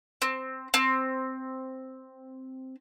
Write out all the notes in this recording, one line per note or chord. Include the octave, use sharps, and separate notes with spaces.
C4
C4